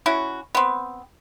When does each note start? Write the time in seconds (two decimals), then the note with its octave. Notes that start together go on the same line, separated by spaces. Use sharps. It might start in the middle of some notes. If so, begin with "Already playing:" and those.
0.06 C#4 E4 F#4
0.55 B3 C4